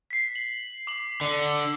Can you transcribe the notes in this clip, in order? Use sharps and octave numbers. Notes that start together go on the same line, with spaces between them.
B6 C7
F#7
D6 F#7
D3